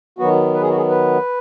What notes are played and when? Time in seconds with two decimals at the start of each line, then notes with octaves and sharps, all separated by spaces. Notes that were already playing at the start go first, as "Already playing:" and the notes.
0.19 D#3 F#3 B3 F#4
0.54 B4
0.61 G#4
0.69 F#4
0.77 G#4
0.89 B4